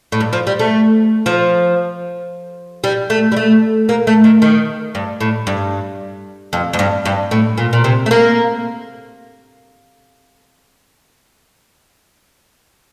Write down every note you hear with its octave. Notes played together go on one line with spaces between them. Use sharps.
A2
G2
F3
G3
A3
F3
G3
A3
G3
A3
A#3
A3
D#3
D#3
G2
A2
G2
F2
F2
G2
G2
A2
A#2
A#2
C3
A3
A#3